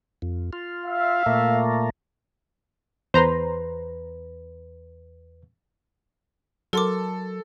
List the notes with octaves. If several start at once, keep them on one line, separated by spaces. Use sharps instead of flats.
F2
F4
E5 F5
A#2 A3 A#3
E2 B4 C5 A#5 C6
F#3 A4 A#4 C6 D6